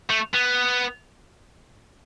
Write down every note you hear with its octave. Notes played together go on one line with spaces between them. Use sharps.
A3
B3